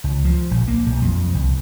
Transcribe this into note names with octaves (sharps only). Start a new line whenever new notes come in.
C#2
F3
A#1
A#3
B1
F2
C2